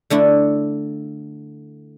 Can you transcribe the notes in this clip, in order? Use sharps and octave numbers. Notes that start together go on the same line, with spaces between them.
D3 A3 D4 E4